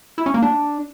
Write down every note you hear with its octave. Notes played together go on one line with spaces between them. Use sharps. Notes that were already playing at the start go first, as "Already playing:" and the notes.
E4
C#4
A#3
D4